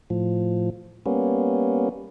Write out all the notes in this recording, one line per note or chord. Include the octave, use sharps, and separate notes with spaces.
A2 F3
G3 A#3 B3 C#4